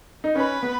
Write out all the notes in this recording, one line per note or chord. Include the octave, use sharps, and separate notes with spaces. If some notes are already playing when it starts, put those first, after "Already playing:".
D#4
C#4 B4
B3